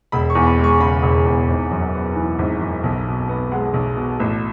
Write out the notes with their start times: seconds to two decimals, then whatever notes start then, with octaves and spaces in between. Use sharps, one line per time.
0.12 E1 B5
0.30 C#6
0.35 E2
0.47 B5
0.58 G#3
0.64 C#6
0.80 C#3 B5
1.03 E1
1.26 E2
1.48 G#1
1.71 F#2
1.93 B3
2.16 E3
2.39 G#1
2.60 F#2
2.83 B1
3.07 B2
3.29 B3
3.51 G#3 F#5
3.74 B1
3.96 B2
4.20 A1